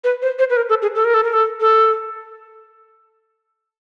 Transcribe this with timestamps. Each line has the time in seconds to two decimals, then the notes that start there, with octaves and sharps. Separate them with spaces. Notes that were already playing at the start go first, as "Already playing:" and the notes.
0.04 B4
0.22 C5
0.39 C5
0.50 B4
0.57 A#4
0.69 A4
0.82 G#4
0.95 A4
1.04 A#4
1.14 A4
1.24 A#4
1.33 A4
1.60 A4